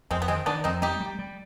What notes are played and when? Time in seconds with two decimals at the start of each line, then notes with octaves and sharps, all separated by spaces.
0.11 F2 G#3 C4
0.22 B3
0.28 D#3 G#3 C4
0.46 D#3 B3 D4
0.64 F2 C4 D#4
0.82 G3 D#4 G4
1.00 G3
1.19 G3